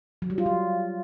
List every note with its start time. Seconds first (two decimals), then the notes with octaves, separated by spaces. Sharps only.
0.22 F#3
0.30 G3
0.38 F4
0.46 F#3